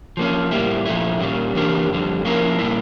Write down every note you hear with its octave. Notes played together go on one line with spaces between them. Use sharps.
F3 A#3 C#4
A2 G3 A#3 E4
A#2 F3 A3 E4
A#2 G3 A#3 C#4
E3 A#3 D4 G4 A#4
F2 D3 G3
F3 A#3 C#4 E4 A#4
A#2 G3 A#3 E4